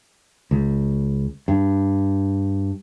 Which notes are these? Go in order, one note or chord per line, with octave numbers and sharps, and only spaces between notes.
C#2
G2